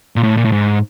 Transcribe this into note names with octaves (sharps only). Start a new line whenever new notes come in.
A#2
A2
A#2
A2
G#2